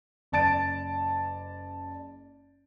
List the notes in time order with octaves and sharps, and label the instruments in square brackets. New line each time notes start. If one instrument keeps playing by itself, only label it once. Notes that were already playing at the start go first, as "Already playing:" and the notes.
[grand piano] F#1 D5 A5 A6 D7